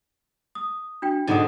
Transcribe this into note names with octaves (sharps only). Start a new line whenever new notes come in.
D#6
D4 F#4 G5
G#2 B2 D3 D#4 F#5 D#6